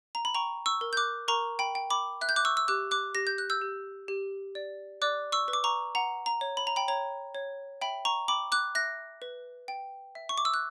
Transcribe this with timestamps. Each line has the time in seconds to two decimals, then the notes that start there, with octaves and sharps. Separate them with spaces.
0.15 A#5
0.25 B5
0.35 G5 A#5 C#6
0.66 C#6 E6
0.81 A#4
0.93 G6
0.97 D6 F#6
1.28 A#4 A#5 C#6
1.59 G5 B5
1.75 G5
1.90 B5 D6
2.21 E5 F#6
2.29 G6
2.36 D6 F#6
2.45 C#6 E6
2.57 E6
2.68 G4 D6 F#6
2.91 D6 F#6
3.15 G4 A#6
3.27 G6
3.38 F#6
3.50 E6 G6
3.61 G4
4.08 G4
4.55 D5
5.02 D5 D6 F#6
5.32 C#6 E6
5.48 B4
5.53 D6
5.64 A#5 C#6
5.95 F#5 A#5
6.26 A#5
6.41 C#5
6.57 B5
6.67 A#5
6.76 G5 B5
6.88 C#5 A#5
7.35 C#5
7.81 E5 G5 B5
8.05 A#5 C#6
8.28 G5 B5 D6
8.52 D6 F#6
8.75 E5 F#6 A#6
9.22 B4
9.68 G5
10.15 E5
10.29 C#6
10.38 D6
10.45 E6
10.54 F#6